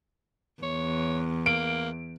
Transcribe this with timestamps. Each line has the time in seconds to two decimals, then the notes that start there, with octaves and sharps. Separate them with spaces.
0.63 E2 C#5
1.46 A#3 D7